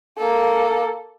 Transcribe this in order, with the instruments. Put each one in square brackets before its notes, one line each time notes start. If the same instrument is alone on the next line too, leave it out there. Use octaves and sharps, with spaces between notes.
[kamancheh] A#3 A4